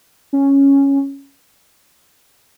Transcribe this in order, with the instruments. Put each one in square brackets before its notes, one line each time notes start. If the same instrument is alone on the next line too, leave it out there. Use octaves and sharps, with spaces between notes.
[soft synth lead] C#4